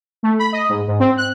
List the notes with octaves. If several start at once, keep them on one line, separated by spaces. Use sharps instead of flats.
A3
B5
D#5
G#2
G#2
C4
F#6